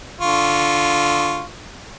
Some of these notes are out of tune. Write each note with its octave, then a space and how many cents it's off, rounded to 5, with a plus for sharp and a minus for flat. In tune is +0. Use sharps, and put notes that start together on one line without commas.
D3 +0 F4 +0 C#6 +0